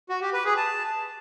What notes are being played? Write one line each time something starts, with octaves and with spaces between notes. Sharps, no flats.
F#4
G4
B4
G#4
A5